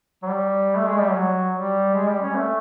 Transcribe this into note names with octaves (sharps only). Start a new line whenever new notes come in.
F#3
G3
A3
G#3
G3
F#3
G3
G#3
G3
C#4
A3